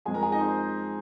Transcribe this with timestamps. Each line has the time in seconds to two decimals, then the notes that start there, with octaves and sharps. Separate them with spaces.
0.05 F2 F3 G#3 G#4 G#5
0.14 A#4 A#5
0.23 G#4 G#5
0.32 D#4 D#5
0.40 C4 C5